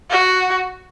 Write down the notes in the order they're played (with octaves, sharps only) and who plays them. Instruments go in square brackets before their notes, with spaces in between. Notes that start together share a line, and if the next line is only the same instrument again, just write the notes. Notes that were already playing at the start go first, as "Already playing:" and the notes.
[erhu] F#4